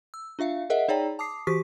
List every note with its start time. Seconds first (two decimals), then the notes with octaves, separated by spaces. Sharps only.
0.14 E6
0.39 D4 F4 E5 F5
0.70 G#4 A#4 D#5 E5 F#5
0.88 D#4 G#4 C#5 D5 G5 A#5
1.19 A5 D6 D#6 C7
1.47 E3 F#4 G4 C#6 B6